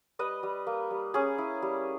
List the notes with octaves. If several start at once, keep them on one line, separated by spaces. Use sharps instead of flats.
G3 B4 D#5
G3
A#3
G3
C#4 G#4
E4
G3